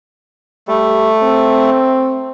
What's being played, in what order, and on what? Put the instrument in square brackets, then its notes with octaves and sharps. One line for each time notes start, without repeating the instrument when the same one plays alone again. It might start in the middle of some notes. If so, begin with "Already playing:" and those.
[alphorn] G3 [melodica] A3
[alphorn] C4